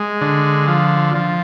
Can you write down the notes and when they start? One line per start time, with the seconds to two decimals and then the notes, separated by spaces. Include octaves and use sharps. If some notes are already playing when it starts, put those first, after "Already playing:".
Already playing: G#3
0.21 D3
0.68 F3
1.15 F3